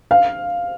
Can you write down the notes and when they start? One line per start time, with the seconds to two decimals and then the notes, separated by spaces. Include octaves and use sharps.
0.11 F5